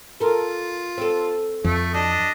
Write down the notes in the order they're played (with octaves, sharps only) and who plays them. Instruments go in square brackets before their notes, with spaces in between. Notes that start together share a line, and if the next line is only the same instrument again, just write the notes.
[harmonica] F4 [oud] A4 A#4
[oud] C4 A4
[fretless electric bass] F2 [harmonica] A3
[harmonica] D4 D#5 [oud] F#4